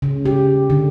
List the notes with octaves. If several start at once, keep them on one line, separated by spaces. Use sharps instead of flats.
C#3
G4
D3